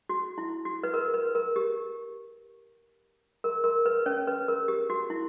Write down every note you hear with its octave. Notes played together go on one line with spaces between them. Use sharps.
F#4
E4
F#4
B4
A#4
B4
A#4
G4
A#4
A#4
B4
C#4 C#5
B4
A#4
G4
F#4
E4